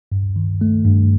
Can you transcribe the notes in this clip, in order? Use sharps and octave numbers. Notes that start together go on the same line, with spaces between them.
G2
D#3
A3
G2